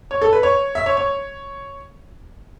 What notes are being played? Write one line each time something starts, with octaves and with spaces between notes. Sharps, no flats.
C#5
A4
B4
C#5
E5
C#5
C#5